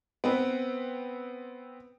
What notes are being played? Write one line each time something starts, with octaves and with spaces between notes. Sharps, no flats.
B3 C4 B4